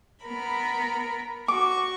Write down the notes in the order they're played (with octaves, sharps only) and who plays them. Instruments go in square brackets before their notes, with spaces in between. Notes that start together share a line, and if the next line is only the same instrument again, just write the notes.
[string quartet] B3 A#4 B5
[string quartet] F#4 C#6 [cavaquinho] D6